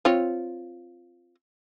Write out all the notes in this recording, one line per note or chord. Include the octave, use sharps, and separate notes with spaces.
C4 F4 C#5